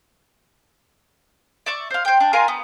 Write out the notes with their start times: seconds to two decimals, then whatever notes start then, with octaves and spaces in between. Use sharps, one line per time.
1.66 D5 E5 C#6
1.90 C5 F5
2.05 C5 G5
2.20 D4
2.33 F4 A#4 G#5 C6
2.48 B3